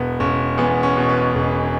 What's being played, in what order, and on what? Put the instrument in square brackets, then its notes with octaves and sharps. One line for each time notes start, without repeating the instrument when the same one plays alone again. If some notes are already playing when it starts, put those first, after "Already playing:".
Already playing: [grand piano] E1 B3
E1 C#4
E2 B3
C#4
B2
B4
E1